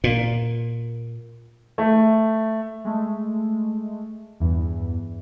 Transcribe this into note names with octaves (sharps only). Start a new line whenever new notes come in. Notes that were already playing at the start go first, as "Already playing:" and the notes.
A#2
A3
G#3 A3
E2 G2 E3